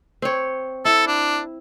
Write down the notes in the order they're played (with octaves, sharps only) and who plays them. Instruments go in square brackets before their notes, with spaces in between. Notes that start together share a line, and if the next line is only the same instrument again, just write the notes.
[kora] C4 C#5
[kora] E4 [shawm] A4
[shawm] D4